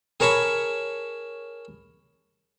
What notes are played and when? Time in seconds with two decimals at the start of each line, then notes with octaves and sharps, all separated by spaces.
0.20 G#4 A#4 C#5 A5 B5 C#6